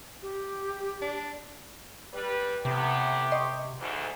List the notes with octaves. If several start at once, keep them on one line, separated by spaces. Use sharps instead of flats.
G4
D4
G3 B4
A2 C3 B3 G4
D#5 C6 C#6
D2 G#2